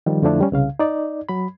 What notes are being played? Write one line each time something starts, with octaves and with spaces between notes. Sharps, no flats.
D#3 F3 G3
F2 D3 F3 A3 D4 E4
G3 C#4
C2 C#3 F5
D#4 D5
F#3 B5